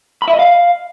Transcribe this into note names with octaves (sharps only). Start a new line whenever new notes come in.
B5
E5
D#5
F5